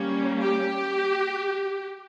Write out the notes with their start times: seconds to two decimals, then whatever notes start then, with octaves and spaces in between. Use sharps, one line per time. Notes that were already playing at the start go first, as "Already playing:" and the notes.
Already playing: G3 A#3 C#4
0.41 G4